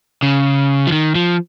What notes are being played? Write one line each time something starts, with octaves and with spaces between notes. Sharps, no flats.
C#3
F3
D#3
F3